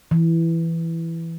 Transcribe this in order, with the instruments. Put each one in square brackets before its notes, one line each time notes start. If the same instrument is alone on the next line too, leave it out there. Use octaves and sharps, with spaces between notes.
[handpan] E3